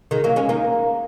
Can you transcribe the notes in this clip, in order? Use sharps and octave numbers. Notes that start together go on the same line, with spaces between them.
D#3 G#3
F#3 A#3
G#3 C#4
A#3 D#4